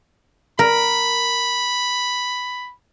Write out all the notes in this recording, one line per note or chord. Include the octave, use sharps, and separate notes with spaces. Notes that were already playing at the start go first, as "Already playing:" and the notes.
A#4 B5